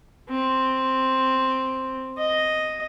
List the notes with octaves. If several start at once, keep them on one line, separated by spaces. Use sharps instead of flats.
C4
D#5